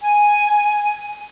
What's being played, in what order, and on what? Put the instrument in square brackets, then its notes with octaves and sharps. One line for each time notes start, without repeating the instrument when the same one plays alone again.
[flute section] G#5